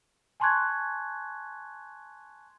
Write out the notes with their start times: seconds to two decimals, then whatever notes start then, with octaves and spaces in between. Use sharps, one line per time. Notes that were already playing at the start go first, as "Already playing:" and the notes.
0.40 G#5 A5 C6 C#6 F#6 G#6